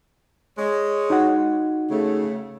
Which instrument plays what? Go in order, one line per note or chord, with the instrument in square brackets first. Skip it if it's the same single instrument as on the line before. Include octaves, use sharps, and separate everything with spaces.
[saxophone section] G#3 C#5
[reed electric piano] D#4 F#4 F#5
[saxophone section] C#3 A3